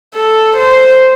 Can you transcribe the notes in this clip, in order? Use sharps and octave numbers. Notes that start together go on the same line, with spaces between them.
A4
C5